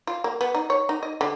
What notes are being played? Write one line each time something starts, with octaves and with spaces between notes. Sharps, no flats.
F4
A#3
B3
D#4
C#5
D#4
D#5
D3